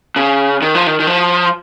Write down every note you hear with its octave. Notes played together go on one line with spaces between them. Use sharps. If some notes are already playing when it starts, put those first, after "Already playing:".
C#3
D#3
F3
D#3
D#3
F3